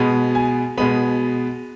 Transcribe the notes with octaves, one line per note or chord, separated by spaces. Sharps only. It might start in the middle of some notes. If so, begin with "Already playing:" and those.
Already playing: B2 G#3 B3
G#5
B2 G#3 B3 B5